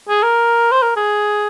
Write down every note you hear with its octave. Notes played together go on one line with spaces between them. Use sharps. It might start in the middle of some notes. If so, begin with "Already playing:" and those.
G#4
A#4
C5
A#4
G#4